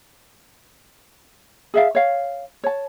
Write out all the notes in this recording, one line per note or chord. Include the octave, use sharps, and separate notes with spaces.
G#4 E5 F5
C#5 F5
C#5 A5